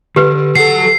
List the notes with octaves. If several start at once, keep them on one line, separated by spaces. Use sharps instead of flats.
D3 G4 B4
F#3 A4 F#5 C7